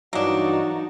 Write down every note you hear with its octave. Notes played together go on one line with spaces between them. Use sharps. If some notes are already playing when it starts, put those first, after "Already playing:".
G2 E3 F#3 A#3 D4 D#4 F#4